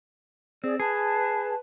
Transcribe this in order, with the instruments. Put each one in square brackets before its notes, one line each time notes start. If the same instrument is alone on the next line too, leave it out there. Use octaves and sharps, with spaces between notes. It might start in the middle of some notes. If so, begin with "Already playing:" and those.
[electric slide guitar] C4 [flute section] G#4 D5
[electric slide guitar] G#4 [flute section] B4 A5